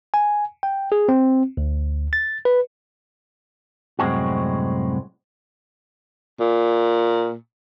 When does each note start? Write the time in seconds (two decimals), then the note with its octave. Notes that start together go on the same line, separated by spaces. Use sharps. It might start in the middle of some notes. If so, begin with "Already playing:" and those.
0.14 G#5
0.63 G5
0.92 G#4
1.09 C4
1.57 D2
2.13 A6
2.45 B4
3.99 C2 F#2 A2 G#3 C4 F#4
6.40 A#2